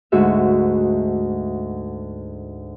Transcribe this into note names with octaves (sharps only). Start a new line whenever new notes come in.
D2 G#2 F#4 G#4 E5